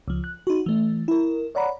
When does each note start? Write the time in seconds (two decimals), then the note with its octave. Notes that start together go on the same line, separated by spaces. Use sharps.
0.08 C#2 F3
0.24 F#6
0.47 D#4 F#4
0.66 E3 A3
1.08 E4 A#4
1.55 C#5 D5 F#5 A#5 B5